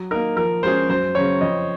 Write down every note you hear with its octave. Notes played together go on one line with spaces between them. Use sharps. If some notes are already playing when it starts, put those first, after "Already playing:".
Already playing: F#3
A#3 D#4 A#4
F3 A#4
G#3 C#4 G#4 C5
F#2 C5
C#3 F#3 C#4 C#5
F2 D#5